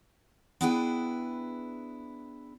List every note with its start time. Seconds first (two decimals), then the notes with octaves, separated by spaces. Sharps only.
0.61 B3 D4 E4 G#4 B4 G5